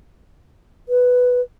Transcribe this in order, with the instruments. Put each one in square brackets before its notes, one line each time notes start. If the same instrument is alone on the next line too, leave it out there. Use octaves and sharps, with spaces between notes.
[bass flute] B4